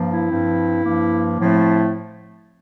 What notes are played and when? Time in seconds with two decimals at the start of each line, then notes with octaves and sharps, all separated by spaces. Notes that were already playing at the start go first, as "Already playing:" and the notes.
Already playing: G2 F3 A#3
0.12 E4
0.30 G2 F3 C4
0.84 G2 F3 A#3
1.39 A2 F3 A3 C4 E4